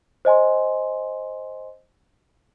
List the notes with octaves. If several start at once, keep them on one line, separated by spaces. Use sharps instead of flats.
C5 D#5 G#5 C6